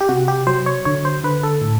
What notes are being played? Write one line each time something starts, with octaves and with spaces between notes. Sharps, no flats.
G4
C3 F#4
G4
F#3 C5
C#5
D3 C#5
C5
D3 B4
A4
A2